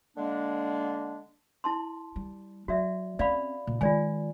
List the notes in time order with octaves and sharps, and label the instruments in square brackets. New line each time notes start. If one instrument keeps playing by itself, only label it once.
[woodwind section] D3 G#3 A#3 D4
[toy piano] E4 A5 C6
[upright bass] G3
[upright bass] F#3 [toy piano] F#4 D5 E5
[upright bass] C4 C#4 [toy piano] D5 F5 B5
[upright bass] A#2
[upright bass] D#3 G#3 [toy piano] F4 D5 G#5